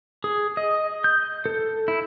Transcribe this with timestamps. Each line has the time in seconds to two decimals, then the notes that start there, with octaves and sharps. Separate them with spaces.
0.24 G#4
0.57 D#5
1.04 G6
1.46 A4
1.88 E4